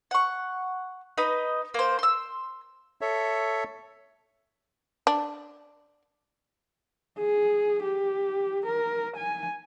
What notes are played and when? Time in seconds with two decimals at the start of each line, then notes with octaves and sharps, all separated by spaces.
0.11 F#5 C#6
1.18 D#4 B4 D#5
1.74 A#3 C5
1.99 C6 E6
3.01 A4 C#5 E5
5.07 D4
7.19 G#4
7.84 G4
8.66 A#4
9.16 G#5